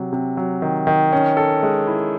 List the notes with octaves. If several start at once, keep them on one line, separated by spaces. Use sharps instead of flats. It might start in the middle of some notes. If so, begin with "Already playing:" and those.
Already playing: C3 F#3
C3
F#3
D#3
D#3
C#4
A4
G#3
E4